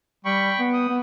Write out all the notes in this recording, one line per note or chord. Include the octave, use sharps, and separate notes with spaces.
G3 G5 B5 C#6
B3
D#6
B3